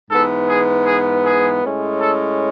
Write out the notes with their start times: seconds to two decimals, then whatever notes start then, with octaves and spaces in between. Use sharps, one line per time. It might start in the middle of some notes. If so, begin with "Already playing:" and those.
0.10 G#2 E3 B3 A4
0.48 G#4
0.86 G#4
1.24 G#4
1.62 A2 G#3 C#4
2.00 A4